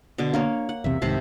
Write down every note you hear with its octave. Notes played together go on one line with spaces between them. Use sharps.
B2 D3 D6
A#3 D4 A#4 C#5
F#5
B1 E2 C3 E5
C2 G#2 C3 D#3 C5 A5